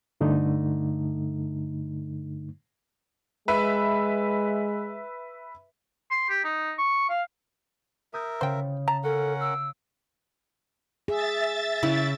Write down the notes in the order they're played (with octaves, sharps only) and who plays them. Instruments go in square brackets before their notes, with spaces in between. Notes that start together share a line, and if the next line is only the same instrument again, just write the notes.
[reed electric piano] G2 D3 A3 D#4
[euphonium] G#3 [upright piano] B4 E5
[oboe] C6
G4
D#4
C#6
F5
[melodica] A#4 E5 [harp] D#6 G6 A6
[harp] C#3 [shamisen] C5 G5
[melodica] A5 [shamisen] A#5
[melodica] C#4 A#4 F#5 [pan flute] A4
[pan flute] E6 [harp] C7 D7
[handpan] G#4 [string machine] E5 A6
[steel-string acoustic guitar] C#3 [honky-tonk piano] E4